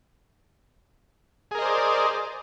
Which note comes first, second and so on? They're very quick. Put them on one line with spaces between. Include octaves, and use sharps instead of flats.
G#4 A#4 D#5 C5 D5